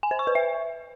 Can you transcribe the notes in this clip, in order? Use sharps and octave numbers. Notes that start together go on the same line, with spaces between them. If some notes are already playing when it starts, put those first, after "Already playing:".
G#5
C5
C#6
B4
E5